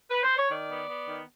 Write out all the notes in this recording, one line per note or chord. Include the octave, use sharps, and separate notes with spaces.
B4
C5
C#5
D#3 D5
B3
B3
D#3